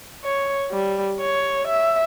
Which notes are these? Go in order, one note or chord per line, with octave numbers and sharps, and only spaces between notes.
C#5
G3
C#5
E5